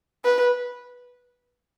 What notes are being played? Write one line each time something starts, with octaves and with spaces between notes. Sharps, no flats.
B4